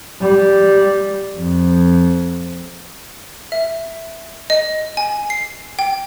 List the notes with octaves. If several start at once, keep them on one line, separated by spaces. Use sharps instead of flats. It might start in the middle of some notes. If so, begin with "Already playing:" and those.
G3
F2
E5
D#5
G#5
C7
G5